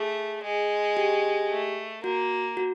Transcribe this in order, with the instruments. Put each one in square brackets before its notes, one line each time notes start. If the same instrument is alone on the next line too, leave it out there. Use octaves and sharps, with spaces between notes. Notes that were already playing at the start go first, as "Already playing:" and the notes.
Already playing: [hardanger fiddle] A3 [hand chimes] G#4
[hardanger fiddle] G#3
[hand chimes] G4
[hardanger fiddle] A3
[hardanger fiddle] A#3 [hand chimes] F#4
[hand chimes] F#4